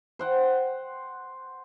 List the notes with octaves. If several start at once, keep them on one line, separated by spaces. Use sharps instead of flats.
C5 F#5 G5